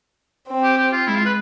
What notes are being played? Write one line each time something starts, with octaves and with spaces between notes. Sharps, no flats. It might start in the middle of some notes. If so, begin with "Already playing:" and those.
C4
G4
G4
F4
G#3 E4
F4
B4